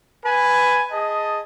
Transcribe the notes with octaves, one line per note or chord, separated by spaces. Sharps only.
B4 G#5
G#4 D#5 A5